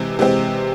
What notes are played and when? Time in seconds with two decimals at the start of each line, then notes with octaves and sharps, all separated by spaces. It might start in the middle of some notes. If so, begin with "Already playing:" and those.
Already playing: C3 E3 G#3 C4
0.19 C3 E3 G#3 C4